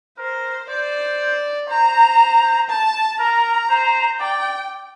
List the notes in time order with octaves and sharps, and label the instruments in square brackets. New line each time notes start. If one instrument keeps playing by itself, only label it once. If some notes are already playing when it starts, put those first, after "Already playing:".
[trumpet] A#4 [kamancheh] C5
[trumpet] C5 [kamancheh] D5
[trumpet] C5 [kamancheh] A#5
[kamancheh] A5
[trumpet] A#4 [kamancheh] A#5
[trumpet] C5
[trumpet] D5 [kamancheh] G5